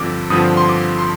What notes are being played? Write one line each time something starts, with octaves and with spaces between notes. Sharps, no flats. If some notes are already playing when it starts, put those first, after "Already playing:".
Already playing: G2 D3 F3 C4 D6
G2 D3 F3 C4 D#6
C6
D6
C6